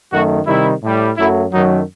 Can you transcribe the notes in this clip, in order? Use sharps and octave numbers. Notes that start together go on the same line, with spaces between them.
F#2 D#3 A3 F#4
C3 D#3 G3 E4
A2 G3
F#2 F#3 A3 E4
F#2 D#3 F#3 A3 D#4